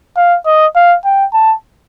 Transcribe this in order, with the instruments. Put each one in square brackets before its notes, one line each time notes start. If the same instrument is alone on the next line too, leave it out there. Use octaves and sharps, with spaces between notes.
[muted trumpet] F5
D#5
F5
G5
A5